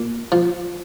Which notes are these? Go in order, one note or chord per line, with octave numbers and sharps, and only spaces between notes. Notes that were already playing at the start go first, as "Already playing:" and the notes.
Already playing: A#2
F3